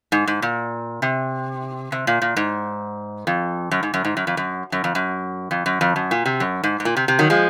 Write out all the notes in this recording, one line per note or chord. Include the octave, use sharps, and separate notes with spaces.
G#2
G#2
A#2
C3
C3
A#2
A#2
G#2
F2
F#2
G#2
F#2
G#2
F#2
F2
F#2
F#2
F2
F#2
F2
F#2
F2
F#2
A#2
C3
F#2
G#2
G#2
A#2
C3
C3
D#3 F#3
F3 G#3